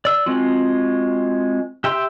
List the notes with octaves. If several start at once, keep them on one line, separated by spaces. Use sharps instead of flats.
D5 E6
G#3 C4 F4 F#4
G4 E5 G5 C6